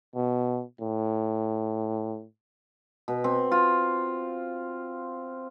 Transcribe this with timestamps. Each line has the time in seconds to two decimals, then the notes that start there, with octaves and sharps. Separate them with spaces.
0.15 B2
0.81 A2
3.08 B2
3.24 C4
3.51 F4